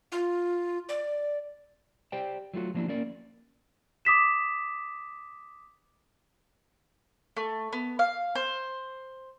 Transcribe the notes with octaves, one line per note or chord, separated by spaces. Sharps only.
F4
D5
G4 C5 D5 G5
F#3 A3 F4 F#4
F3 F#3 A#3 D4 E4 F#4
A#3 C#4 A#4 D5
D6 D#6 B6 E7
A3
B3
F5
C5